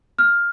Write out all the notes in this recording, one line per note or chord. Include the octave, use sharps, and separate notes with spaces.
F6